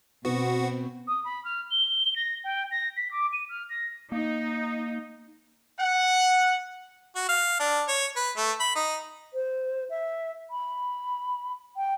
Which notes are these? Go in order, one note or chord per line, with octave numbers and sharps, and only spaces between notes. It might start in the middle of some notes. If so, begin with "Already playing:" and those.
B2 B3 C4 F#4
D#6
B5
F6
G7
A#6
G5
A#6
B6
D6
D#7
F6
A#6
A#3 D#4
F#5
F#4
F5
D4
C#5
B4
A3
B5
D#4
C5
E5
B5
G5